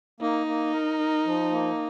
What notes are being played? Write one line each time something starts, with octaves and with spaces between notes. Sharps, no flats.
A#3 D#4
A#3
A#4
A#4
F3
A#3